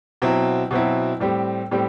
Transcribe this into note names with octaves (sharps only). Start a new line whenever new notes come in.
B2 F#3 C4 E4
B2 F#3 C4 E4
A2 G3 C4 G4
A2 G3 C4 G4